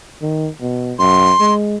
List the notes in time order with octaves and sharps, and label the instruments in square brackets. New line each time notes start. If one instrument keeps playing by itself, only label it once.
[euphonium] D#3
B2
[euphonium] F#2 [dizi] C6
[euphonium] G#3